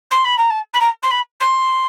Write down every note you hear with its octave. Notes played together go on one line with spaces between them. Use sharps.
C6
B5
A#5
A5
B5
A#5
C6
B5
C6